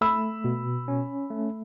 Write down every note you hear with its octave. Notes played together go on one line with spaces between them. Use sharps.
A3 B5 E6
B2
C#4
A3